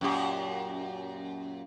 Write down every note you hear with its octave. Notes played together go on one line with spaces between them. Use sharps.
F#2 A#2 G4